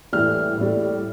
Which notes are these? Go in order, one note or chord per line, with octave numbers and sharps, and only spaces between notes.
A2 E3 G3 F6
A2 G3